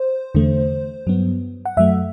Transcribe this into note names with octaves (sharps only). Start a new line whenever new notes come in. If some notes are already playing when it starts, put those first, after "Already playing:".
Already playing: C5
E2 D3 A3
G2 F#3 B3
F#5
F#2 F#3 A3 E5